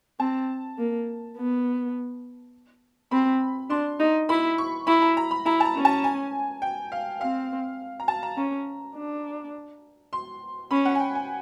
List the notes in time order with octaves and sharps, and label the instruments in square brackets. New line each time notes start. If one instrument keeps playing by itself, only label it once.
[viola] C4 [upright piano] A5
[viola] A#3
B3
[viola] C4 [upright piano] B5
[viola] D4 [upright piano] C6
[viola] D#4
[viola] E4 [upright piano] B5
[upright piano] C#6
[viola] E4 [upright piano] B5
[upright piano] A#5
A#5
B5
[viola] E4 [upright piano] A#5
[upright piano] A5
A#5
[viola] C#4
[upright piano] A5
G#5
G5
F5
[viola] C4 [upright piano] F5
[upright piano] A#5
A5
A#5
[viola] C#4 [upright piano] A#5
[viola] D4
[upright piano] C6
[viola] C#4 [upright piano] B5
[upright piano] F#5
G#5
G5
G#5